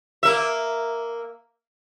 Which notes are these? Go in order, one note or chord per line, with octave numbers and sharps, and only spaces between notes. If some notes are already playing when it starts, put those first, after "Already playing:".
A#3 E5